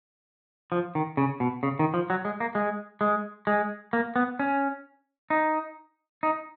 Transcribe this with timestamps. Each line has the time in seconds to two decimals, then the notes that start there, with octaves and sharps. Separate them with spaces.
0.72 F3
0.95 D#3
1.17 C#3
1.40 B2
1.63 C#3
1.79 D#3
1.94 F3
2.10 F#3
2.25 G#3
2.40 A#3
2.55 G#3
3.01 G#3
3.47 G#3
3.93 A#3
4.16 B3
4.39 C#4
5.30 D#4
6.23 D#4